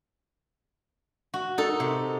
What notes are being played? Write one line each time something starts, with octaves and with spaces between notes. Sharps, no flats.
F#4
D#4 A4
C3